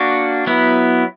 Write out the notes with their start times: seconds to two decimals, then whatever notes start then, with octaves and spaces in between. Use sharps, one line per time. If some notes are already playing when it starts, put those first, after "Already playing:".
Already playing: A#3 D4 F#4
0.47 F#3 B3 E4